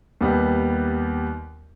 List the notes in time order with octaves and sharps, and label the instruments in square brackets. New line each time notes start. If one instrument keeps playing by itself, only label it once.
[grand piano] D#2 G3 B3